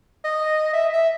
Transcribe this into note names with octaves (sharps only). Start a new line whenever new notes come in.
D#5
E5
E5